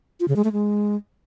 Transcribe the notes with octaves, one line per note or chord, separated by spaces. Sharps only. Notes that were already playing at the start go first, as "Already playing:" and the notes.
F4
C#3
G#3
A3
G#3